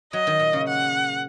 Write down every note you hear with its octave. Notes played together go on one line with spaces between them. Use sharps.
F#3 D#5
D#3
A#2
C#3
F#5